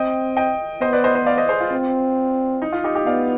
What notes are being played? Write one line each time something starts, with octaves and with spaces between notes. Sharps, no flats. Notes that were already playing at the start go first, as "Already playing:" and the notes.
Already playing: C4 D#5 G5
D#5 G5
B3 C5 D#5
B4 D5
C5 D#5
C5 D#5
D5 F5
C5 D#5
G#4 C5
F4
C4
D#4
F4
D#4 G4
D#4 G4
B3 D5 F5